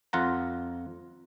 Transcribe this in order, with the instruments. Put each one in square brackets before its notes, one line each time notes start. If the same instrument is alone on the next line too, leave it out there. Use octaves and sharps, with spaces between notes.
[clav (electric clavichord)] F2 F4 F#5 A#5